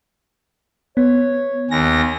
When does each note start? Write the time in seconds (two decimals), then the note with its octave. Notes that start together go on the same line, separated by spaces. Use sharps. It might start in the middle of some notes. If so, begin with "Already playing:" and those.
0.97 B3 C#5
1.71 D#2 G#5 A#6